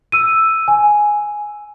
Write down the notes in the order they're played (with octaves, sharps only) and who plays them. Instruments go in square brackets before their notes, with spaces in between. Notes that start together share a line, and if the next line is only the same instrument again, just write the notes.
[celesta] E6 D#7
G#5